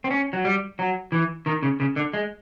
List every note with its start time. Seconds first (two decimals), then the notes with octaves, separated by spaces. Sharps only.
0.04 C4
0.10 C#4
0.33 F#3
0.45 G3
0.79 F#3
1.12 E3
1.46 D#3
1.62 C#3
1.80 C#3
1.96 D3
2.13 G#3